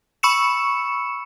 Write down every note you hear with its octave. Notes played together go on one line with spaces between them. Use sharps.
B5 C#6 E6 C#7 E7